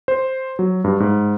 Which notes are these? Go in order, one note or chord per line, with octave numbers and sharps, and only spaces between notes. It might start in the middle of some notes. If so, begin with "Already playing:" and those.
C5
F#3
G2
G#2